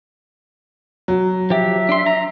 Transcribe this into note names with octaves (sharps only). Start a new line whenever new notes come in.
F#3
F3 G4 E5
D4 C6
A#5